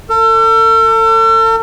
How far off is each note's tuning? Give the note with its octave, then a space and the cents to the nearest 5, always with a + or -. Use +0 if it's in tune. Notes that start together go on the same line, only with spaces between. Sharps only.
A4 +40